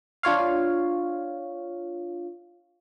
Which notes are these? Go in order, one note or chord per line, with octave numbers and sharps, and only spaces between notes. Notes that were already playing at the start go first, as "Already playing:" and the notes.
D4 F4 C#5 F5